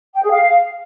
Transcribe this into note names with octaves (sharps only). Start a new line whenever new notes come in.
G5
G#4
F5